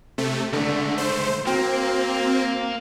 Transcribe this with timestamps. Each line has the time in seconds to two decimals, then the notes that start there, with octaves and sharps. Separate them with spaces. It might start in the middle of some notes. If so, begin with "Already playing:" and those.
0.18 C3 A3
0.53 C#2 D3 A3
0.98 C5
1.47 A#3 C4 F#4